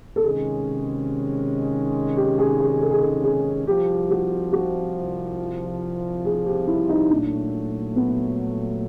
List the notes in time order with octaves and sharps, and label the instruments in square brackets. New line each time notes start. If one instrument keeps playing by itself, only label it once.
[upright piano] A4
[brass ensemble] C3 D#3 G#3 C#4 [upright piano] G#4
[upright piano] G4
G#4
G#4
A4
G#4
A4
G#4
[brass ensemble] C2 C3 F3 [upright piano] G4
[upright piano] F#4
F#4
G#4
G4
E4
D#4
[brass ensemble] A#2 F#3 A3 [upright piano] D4
[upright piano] B3